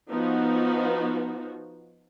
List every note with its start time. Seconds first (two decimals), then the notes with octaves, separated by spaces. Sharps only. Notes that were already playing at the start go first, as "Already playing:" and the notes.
0.10 F3 B3 D#4 F#4